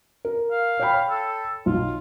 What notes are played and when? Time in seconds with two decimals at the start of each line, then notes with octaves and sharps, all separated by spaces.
0.25 A#4
0.51 F5
0.79 C#5 G5 B5
1.09 A4
1.66 B1 F4